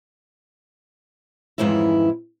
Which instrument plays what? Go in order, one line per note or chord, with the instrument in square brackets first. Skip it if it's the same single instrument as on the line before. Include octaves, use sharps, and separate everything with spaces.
[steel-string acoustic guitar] F2 G#2 D#3 E3 C#4 E4